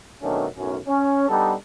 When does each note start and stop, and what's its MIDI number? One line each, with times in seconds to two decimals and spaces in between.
0.22 0.46 47
0.22 0.46 51
0.22 0.46 54
0.22 0.46 57
0.22 0.46 61
0.22 0.46 62
0.57 0.77 35
0.57 0.77 42
0.57 0.77 45
0.57 0.77 61
0.87 1.27 61
1.29 1.53 55
1.29 1.53 59
1.29 1.53 62
1.29 1.53 63
1.29 1.53 69